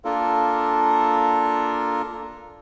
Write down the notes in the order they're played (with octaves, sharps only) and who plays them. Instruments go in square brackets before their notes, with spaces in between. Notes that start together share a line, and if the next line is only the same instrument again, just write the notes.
[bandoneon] A#3 D4 F4 A4 A#4